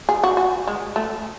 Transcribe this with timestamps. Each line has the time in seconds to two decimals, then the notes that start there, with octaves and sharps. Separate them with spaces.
0.09 G#4
0.23 F#4
0.37 F#4
0.67 G#3
0.96 A3